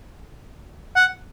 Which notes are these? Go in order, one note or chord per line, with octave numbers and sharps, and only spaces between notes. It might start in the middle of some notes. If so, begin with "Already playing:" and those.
F#5